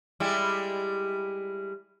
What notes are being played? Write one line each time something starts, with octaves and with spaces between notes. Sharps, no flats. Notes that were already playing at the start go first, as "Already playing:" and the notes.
G3 G#3 E4